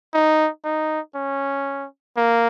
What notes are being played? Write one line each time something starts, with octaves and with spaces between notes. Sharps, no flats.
D#4
D#4
C#4
A#3